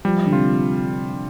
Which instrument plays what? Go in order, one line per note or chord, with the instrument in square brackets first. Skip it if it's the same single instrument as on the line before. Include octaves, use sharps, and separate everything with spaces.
[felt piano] F3 [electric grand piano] G3
[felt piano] D3
[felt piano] C3 [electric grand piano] F4